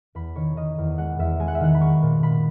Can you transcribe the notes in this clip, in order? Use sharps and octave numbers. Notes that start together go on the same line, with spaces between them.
E2 B5
D#3 C#5
D#3 D#5
E2
G#3 F#5
E2 E5
G#3 G#5
F#5
E5
D#3 F#5
B5
F#3 C#6
A#2
A#2 B5